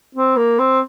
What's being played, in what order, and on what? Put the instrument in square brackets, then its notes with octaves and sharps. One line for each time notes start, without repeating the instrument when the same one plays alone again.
[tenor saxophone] C4
A#3
C4